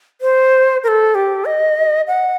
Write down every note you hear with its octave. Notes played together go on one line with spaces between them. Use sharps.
C5
A#4
A4
G4
D#5
F#5